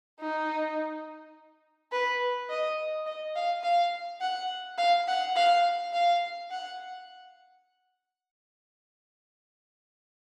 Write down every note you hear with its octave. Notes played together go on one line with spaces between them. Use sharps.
D#4
B4
D#5
D#5
F5
F5
F#5
F5
F#5
F5
F5
F#5